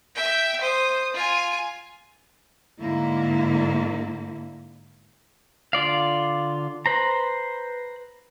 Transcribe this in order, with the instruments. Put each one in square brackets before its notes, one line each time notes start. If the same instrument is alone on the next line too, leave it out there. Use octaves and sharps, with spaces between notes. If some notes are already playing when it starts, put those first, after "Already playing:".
[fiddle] E5 G5
C5 D#6
F4 G#5
[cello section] G#2 D3 A#3 E4
[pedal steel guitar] D3 F4 D5 F5
B4 C5 A#5